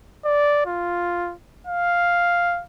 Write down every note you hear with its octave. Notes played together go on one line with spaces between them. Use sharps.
D5
F4
F5